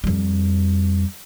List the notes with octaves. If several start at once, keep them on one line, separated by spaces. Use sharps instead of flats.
F2 G3